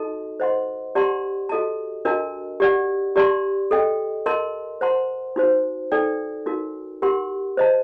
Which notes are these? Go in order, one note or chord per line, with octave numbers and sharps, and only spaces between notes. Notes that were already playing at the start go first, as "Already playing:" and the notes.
Already playing: D#4 F#4 A4 D#5 A5
C5 D#5 F#5 C6
G4 D5 F#5 A5 C6
F#4 A4 D#5 A5
D4 F#4 A#4 D#5 A5
G4 D5 F#5
G4 D5 A5 C6
A4 D#5 G5
A#4 D#5 A5 C6
C5 F#5 A5 C6
D#4 F#4 C5
D#4 A4 D5 G5
D#4 F#4 A#4
G4 A#4 F#5 C6
C5 D#5 A5